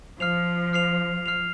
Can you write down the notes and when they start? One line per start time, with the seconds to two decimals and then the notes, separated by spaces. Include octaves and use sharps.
0.20 F3 F6 C7 F7
0.73 F6 C7 F7
1.26 F6 C7 F7